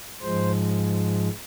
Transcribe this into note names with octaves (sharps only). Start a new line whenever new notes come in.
G#2 F3 G#3 C5